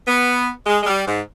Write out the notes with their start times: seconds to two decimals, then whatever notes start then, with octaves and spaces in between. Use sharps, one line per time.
0.07 B3
0.67 G#3
0.82 G#3
0.86 G3
1.06 G#2